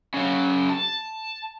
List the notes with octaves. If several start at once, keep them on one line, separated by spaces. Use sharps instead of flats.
C#3 F#3
A5